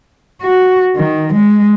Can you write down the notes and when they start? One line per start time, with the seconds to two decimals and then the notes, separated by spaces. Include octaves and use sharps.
0.42 F#4
0.96 D#3
1.33 G#3